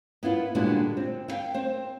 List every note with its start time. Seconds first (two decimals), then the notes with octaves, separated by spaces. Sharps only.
0.23 B3 E4 F4 B4
0.55 A#2 D3 G3 G#3 D4 F#4
0.97 C4
1.28 E4 F5 G5
1.54 C4 C5